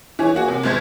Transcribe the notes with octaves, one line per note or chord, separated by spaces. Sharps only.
E3 G#4 C#5
A#3 F#4 G#4
C3
G1 B2 G#3 C5 G#6